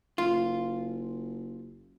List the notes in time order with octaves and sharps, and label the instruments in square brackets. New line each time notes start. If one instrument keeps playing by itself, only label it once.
[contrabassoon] F#1 [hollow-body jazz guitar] F4